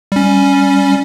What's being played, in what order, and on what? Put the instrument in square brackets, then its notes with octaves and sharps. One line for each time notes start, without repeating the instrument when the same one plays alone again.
[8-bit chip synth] G3 C#4